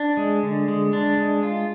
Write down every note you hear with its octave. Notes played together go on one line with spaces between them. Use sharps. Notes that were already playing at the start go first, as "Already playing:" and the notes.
Already playing: D4
G#3
D3
G#3
D4
G#3
F4